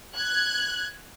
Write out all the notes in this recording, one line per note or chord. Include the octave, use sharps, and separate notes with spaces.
F#6 G#6